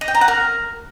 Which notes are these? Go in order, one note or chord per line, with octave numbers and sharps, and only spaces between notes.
D#5
G5
A#5
F#5
A#4